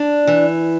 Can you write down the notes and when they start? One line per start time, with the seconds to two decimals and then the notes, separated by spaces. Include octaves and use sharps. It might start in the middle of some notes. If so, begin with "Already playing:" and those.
Already playing: D4
0.27 E3